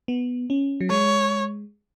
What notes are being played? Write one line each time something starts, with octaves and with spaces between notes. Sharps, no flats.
B3
C#4
F#3
G#3 C#5